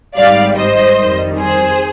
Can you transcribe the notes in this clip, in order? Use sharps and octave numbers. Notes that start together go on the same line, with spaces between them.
G#1 G#2 G3 D5 F5
C5 D#5
F2 D#3 G3
G#4 C5